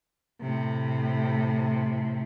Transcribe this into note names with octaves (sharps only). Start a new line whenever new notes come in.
A2 C3